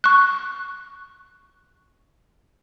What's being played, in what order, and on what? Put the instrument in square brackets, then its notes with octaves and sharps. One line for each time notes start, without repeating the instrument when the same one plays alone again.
[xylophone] C#6 F#6